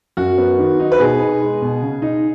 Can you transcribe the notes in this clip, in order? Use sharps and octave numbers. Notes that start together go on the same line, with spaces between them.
F#2 F#4
B3
D#3
D#4
B4
B2 G#4
D#4
G#3
B2
C#3
D#4